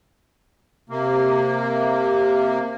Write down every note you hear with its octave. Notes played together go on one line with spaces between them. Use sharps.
C3 A#3